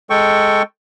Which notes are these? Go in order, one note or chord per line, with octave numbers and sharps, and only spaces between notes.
G#3 A4 G5 C#6